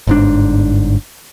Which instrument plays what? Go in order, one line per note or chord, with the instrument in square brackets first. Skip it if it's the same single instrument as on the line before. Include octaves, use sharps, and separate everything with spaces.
[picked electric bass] G1 G#2 D4